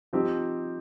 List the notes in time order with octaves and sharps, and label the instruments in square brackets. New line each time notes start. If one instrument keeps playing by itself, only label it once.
[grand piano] F3 C4 D#4 G4